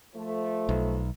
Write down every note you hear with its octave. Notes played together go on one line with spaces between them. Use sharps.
F3 A3
B1